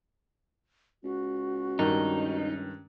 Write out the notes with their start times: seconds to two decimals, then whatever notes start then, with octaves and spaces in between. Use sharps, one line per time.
1.04 C#2 F#4
1.79 G2 D#3 D#4